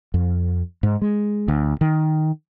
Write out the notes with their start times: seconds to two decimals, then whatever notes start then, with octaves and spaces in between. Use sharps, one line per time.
0.14 F2
0.83 G#2
1.02 G#3
1.48 D2
1.81 D#3